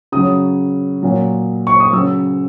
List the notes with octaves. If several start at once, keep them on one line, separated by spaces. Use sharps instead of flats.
C#3 F#3 D#6
A#2 F#3
C#6
D#6
C#3 F#3 E6